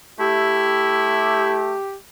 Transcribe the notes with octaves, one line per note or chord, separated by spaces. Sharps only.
A3 E4 G4